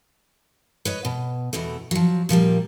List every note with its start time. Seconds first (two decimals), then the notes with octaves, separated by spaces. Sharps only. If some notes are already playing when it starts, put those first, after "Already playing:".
0.85 B4 C#5 D#5
1.05 B2
1.53 E2 B2 E3 A3
1.91 F3 F#3
2.29 A#2 F3 G3 A#3